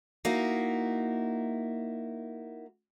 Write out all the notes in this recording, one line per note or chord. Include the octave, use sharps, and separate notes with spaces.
A#3 D#4 E4 F#4